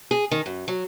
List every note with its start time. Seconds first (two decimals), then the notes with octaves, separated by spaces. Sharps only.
0.11 G#4
0.31 D#3
0.46 F#2
0.68 F#3